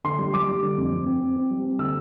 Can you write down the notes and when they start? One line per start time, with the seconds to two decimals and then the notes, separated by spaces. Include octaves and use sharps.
0.04 D3 C6
0.19 G3
0.34 G3 D6
0.48 G3
0.62 D3
0.78 F2
0.92 F2
1.06 C4
1.21 C4
1.36 C4
1.51 G3
1.65 C4
1.79 D3 E6